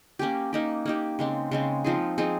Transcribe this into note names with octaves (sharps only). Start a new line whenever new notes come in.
A#3 C#4 G4
A#3 D#4 G4
A#3 D#4 G4
C#3 G#3 C4
C#3 G#3 C4
F3 C4 D#4 G#4
F3 C4 D#4 G#4